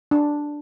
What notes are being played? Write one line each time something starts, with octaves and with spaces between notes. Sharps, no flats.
D4